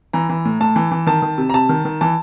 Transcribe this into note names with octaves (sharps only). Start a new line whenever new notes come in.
E3 A#5
E3
A2
A2 A5
E3
E3
D#3 A5
D#3
C3
A#5
C3 A5
D#3
D#3
E3 A5